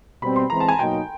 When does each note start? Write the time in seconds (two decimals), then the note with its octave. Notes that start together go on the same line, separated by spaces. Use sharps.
0.22 B2 G3 C4 B5
0.36 C6
0.50 E3 G#3 C4 A#5
0.60 A5
0.69 G#5
0.78 B2 F#3 A#3 D#4 G5